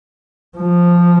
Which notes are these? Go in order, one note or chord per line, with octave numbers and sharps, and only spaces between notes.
F3